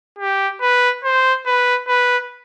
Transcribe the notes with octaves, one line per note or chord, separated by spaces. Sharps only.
G4
B4
C5
B4
B4